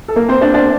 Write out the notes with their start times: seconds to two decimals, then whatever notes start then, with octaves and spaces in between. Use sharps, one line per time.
0.08 A4
0.16 A#3 A#4
0.29 C4 C5
0.41 D4 D5
0.54 D4 D5